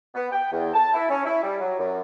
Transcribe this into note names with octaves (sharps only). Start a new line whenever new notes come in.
B3
G5
E2
A5
E4
C#4
E4
G3
F#3
F#2